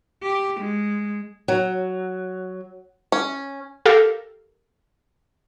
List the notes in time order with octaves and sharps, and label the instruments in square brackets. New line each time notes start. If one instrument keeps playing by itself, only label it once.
[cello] G4
G#3
[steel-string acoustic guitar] F#3
[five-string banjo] C#4
[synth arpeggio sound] G4 A4 A#4 F5